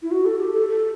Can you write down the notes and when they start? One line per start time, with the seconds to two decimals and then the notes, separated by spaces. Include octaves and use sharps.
0.03 E4
0.11 F#4
0.25 A4
0.40 G4
0.54 A4
0.68 A4